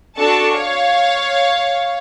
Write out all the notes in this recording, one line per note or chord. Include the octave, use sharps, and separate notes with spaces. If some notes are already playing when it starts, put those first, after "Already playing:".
D4 F#4 A4 A5 C#6
C#5 F5